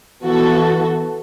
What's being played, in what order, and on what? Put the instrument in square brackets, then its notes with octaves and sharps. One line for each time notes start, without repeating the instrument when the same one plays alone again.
[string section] E3 B3 F#4 A4